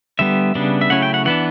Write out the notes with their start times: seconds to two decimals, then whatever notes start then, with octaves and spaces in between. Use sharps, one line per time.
0.19 D3 G3 B3 E5
0.55 C#3 G3 B3 D4
0.81 E5
0.90 C#3 F#3 A3 C#4 E4 F#5
1.02 G5
1.14 F#5
1.25 E3 B3 D4 F#5